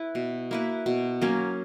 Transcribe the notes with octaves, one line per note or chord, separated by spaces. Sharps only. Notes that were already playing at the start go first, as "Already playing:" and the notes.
Already playing: E4 B4
B2
A#3 E4 B4
B2
F#3 A#3 C#4